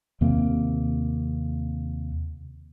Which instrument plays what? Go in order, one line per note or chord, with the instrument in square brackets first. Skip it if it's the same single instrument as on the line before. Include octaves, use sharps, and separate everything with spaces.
[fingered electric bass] D#2 C3 A#3 C4